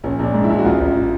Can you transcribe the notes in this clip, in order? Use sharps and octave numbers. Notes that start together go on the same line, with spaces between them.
A#1 C#4
A#1 D4
G#2
E4
A#1
F#4
A1 F4
A1